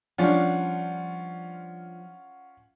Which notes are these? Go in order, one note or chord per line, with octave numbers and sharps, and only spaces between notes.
F3 G3 C#4 D4 F4 D5 F#5